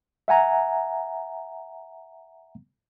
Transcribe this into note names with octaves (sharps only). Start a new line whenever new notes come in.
E5 F#5 G#5 A#5